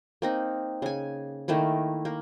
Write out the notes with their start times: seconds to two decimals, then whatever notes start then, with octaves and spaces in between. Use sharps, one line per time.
0.22 A#3 C4 D#4
0.82 C#3 G#5
1.48 D#3 A3 A#3 E4
2.05 A#3